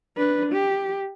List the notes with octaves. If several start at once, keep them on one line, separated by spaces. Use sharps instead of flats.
D4 B4
G4